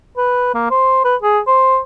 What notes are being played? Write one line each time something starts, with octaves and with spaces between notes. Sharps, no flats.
B4
A#3
C5
B4
G#4
C5